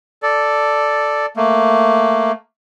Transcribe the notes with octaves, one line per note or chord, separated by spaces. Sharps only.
A4 D5
A3 A#3